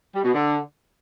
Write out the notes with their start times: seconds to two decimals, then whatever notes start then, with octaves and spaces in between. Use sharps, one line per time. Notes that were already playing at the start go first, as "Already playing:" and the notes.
0.14 G3
0.24 B2
0.34 D3